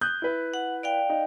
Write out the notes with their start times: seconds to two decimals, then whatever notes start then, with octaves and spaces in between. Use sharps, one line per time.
0.01 D#6 F#6 G6
0.22 E4 B4
0.54 F#5
0.83 D5 F5 G5
1.09 D#4